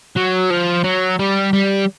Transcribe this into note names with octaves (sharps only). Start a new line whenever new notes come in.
F#3
F3
F#3
G3
G3